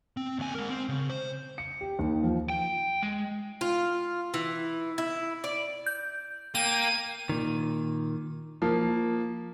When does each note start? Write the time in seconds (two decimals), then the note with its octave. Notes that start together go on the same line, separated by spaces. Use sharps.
0.17 C4
0.39 D#2 G#5
0.55 G#3 A#4
0.69 C4
0.89 C#3
1.10 C5
1.58 C#7
1.81 G4
1.99 D#2
2.23 F3
2.50 G5
3.03 G#3
3.61 F4
4.34 E3
4.98 E4
5.44 D5
5.86 G6
6.55 A#3 G5 D#7
7.30 A#2 D#3
8.62 F3 A#3